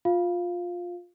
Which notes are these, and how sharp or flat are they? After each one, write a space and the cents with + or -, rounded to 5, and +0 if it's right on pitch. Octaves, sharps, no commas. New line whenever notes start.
F4 +15 F5 -10